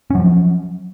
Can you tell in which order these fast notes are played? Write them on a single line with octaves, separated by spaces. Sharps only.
C#4 F#3 F3